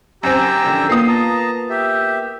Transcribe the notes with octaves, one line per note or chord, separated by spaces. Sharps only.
F#2 C4 G4 A#5 E6
F2 D3 D#3
A#3 B3 F4 D#6 C7
A5 A#5
G4 E5